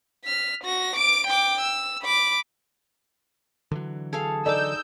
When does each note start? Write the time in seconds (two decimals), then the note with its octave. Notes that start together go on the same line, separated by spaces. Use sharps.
0.25 F6 B6
0.64 F#4 A#6
0.96 D6 D7
1.27 G5 D6
1.61 E6
2.02 B5 D6
3.72 D3 E3 F#3
4.13 G#4 A4 F5
4.46 D#4 A4 D5 D#5 D6 E6 G6